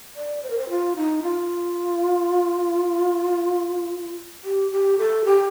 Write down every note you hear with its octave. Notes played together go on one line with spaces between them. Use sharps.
D5
C5
A#4
C5
F4
D#4
F4
G4
G4
A4
G4